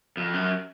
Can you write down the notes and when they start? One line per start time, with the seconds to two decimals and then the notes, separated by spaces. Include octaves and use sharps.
0.17 F2
0.33 F#2